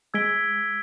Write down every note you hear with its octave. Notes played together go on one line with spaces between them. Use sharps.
G#3 E6 G#6 B6 D7 G7